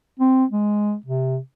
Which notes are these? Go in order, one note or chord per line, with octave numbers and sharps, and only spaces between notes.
C4
G#3
C3